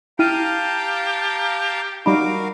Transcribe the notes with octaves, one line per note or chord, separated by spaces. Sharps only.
E4 G4 F5 G5 A5 A#5 F6 D#7
G3 D#4 F#4 A#4 F5 B5 D6